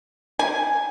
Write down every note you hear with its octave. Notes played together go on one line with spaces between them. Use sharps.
G#5